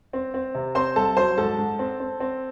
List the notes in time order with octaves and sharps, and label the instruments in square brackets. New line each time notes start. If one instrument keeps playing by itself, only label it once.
[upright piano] C4
C4
C3
C4 C5 C6
C2 A4 A5
F#3 C5 C6
G#2 A4 A5
G#2
C4
C4
C4